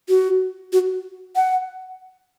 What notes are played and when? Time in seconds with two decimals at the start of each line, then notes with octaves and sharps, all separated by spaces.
0.09 F#4
0.73 F#4
1.36 F#5